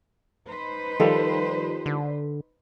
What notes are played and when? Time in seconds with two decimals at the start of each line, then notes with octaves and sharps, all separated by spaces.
0.47 D#4 B4 C5
1.00 D#3 F3 G3 A4
1.86 D3